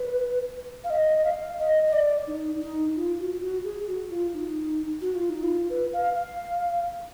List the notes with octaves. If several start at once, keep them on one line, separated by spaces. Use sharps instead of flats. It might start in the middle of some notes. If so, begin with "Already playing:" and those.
Already playing: B4
F5
D#5
D#5
F5
D#5
D#5
D5
D#4
D#4
F4
F#4
F#4
G#4
F#4
F4
D#4
F#4
F4
D#4
F4
B4
F5
F5